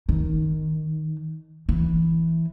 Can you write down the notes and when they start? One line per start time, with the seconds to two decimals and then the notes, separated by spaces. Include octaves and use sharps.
0.09 D#3
1.69 E3